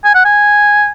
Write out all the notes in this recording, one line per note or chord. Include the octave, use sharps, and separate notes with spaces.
G#5
F#5
G#5